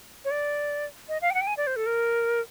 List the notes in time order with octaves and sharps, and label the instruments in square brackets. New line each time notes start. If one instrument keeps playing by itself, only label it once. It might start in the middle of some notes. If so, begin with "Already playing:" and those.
[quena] C#5
D5
D#5
F5
G5
F#5
G5
G#5
D5
C5
A4
A#4